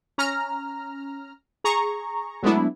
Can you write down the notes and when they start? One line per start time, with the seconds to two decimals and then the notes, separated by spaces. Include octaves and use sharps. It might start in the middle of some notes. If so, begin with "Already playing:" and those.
0.18 C#4 A#5 F6
1.64 G#4 A#5 C#6
2.43 F#3 G#3 A3 B3 D4 E4